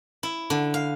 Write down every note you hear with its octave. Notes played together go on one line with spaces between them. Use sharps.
E4
D3
F5